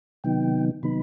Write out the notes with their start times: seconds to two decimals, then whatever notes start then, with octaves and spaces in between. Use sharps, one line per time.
0.24 C3 D#3 F#3 B3 D#4 G5
0.83 C3 D#3 F#3 B3 D#4 B5